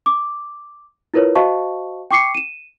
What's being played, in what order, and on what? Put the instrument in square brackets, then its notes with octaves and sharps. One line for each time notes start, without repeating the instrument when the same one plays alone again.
[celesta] D6
E4 F4 A#4 B4 C#5
F#4 C5 D#5 F5 A5 C#6
G5 C#6 D6 C7 C#7
D#7 E7